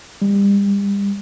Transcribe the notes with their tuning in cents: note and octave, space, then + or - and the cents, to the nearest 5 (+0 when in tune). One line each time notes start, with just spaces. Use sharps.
G3 +35